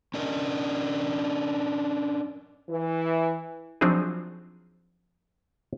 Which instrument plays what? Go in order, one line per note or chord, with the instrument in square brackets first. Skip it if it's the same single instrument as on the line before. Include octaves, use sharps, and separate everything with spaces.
[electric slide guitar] C#4 D4 A#4 C#5 D#5
[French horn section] E3
[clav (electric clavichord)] F3 F#3 C4 D4 D#4 G#4